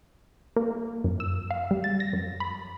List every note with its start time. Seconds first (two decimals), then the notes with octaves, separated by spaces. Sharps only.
0.56 A#3
1.04 F#2
1.20 E6
1.51 F5
1.71 G3
1.84 A6
2.00 A#6
2.13 F#2
2.40 B5